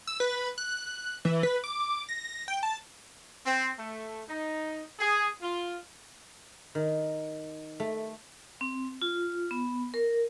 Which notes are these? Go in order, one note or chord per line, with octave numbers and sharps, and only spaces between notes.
E6
B4
F#6
E3
B4
D6
A#6
G5
A5
C4
A3
D#4
G#4
F4
D#3
A3
C4
F4
B3
A#4